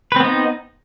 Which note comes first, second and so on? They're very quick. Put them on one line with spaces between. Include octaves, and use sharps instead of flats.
B4 C4 B3 D#4